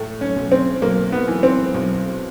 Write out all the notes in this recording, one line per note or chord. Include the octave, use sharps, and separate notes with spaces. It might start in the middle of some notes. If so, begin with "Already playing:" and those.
Already playing: A2 A3
C#4
B1
C4
B1 A#3
B3
E3
C4
B1